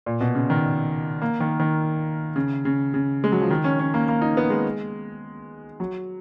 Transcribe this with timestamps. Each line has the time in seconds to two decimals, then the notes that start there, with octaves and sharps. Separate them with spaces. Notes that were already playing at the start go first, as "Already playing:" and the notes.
0.06 A#2
0.21 B2
0.35 C#3
0.50 D#3
1.22 A#3
1.40 D#3
1.60 D#3
2.36 C#3
2.65 C#3
2.94 C#3
3.24 G#3
3.32 F#3
3.42 F3
3.50 D#3
3.64 C#4
3.79 C#4
3.94 A#3
4.08 A#3
4.22 D#4
4.37 B3
4.50 G#3
5.80 F#3